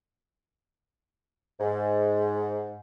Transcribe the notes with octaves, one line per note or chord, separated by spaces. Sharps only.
G#2